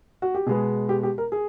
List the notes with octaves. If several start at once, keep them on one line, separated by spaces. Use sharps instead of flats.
F#4
G4
B2 G#3 B3 G#4
G4
G4
A#4
G#4